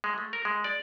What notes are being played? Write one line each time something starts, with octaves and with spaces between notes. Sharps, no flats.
G#3
A3
A#4
G#3
D5